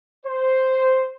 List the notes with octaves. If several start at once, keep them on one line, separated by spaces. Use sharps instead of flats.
C5